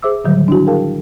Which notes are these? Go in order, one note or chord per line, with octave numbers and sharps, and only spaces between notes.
G#4 C5 E5 D6 E6
A2 D3 D#3 F#3 G3
D4 E4 F#4
G#4 A#4 F5 G5 A5